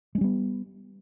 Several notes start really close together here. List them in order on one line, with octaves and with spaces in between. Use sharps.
G#3 C#4 G3 B3